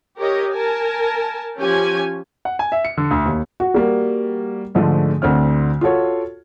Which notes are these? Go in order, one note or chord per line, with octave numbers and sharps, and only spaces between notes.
G4 A#4 C#5 D#5
A#4 G#5 A5
F3 C#4 G4 C#5 G#5
F#5
G#5
E5
C#7
D3
D2
D#2
F#4
G3 A#3 F#4
G#2 D3 F3 G#3 A3
D2 D3 C4 F6
F4 F#4 A4 C#5